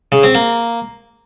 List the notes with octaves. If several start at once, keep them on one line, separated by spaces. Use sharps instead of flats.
C#3
C4
A#3